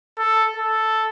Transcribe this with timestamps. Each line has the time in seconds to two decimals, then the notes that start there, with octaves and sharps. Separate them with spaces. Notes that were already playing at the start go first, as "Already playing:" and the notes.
0.18 A4
0.57 A4